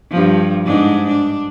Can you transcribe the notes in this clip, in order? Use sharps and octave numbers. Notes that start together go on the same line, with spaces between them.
G2 F3
G#2 D4
D4